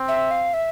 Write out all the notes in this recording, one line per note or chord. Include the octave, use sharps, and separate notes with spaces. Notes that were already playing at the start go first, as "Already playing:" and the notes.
Already playing: C4
E5
F5
E5